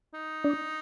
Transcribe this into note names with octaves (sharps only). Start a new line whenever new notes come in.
D#4
D4